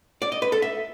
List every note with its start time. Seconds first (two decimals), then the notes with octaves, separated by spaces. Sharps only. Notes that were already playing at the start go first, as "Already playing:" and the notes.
0.22 D5
0.32 D#5
0.42 B4
0.52 A4
0.62 E5